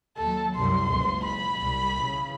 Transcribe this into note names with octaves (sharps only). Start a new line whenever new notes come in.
D#2 F#3 A4
C2 F#2 G3 C6
F#1 C#2 C#3
B5
C2 G3
C#3 E3